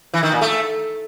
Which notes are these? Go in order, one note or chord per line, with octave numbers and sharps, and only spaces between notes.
E3
D#3
A#2
A3